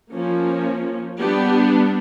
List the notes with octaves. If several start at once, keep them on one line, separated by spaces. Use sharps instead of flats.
F3 A#3 C#4
G3 B3 D4 G4